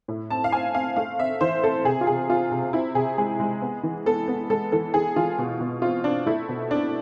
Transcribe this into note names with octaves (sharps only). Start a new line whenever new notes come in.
A2
C4 A5
F5
C4 G#5
C4 F5
A3 F5
C4 E5
E3 C5
C4 A4
C3 G#4
F4
C3 G#4
C4 F4
C3
C4 E4
C3 G#4
G#3 G#4
G#3
B3
E3
B3 A4
B3
G#3 A4
E3 A4
E3 G#4
E3 F4
B2
B2
C4 F4
C4 D4
A3 E4
B2
C4 D4